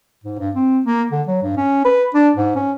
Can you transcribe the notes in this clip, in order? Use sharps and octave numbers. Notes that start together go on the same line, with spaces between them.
G#2
G2
C4
A#3
D3
F#3
G2
C#4
B4
D4
G#2
C#4